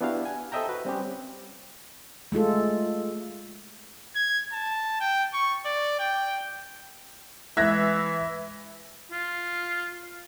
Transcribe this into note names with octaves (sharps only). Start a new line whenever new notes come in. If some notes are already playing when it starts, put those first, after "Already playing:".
B3 D4 E4 F#4 G4 F5
G#5
A4 C5 D#5 E5 G5 A#5
F#4 B4
G3 C4 C#4 G4
G#3 A3 F4 A4
G#6
A5
G5
C#6
D5
G5
E3 G#3 E4 E5 F#6 G#6 A#6
F4